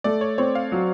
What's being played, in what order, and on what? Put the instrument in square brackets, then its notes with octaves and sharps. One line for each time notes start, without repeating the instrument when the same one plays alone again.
[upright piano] A3 [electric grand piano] D5
[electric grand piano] C#5
[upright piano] C4 [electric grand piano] C#5
[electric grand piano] F5
[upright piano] F#3